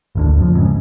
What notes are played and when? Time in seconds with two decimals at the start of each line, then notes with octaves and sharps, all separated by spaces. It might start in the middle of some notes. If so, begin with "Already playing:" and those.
0.15 G#1 D2 D3
0.38 F#1 F2 F3
0.55 G#2 C#3